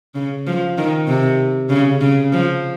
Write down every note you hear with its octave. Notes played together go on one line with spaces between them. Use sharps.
C#3
F3
D#3
C3
C#3
C#3
F3